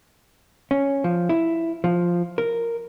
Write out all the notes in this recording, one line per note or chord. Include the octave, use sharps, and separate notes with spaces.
C#4
F3
E4
F3
A#4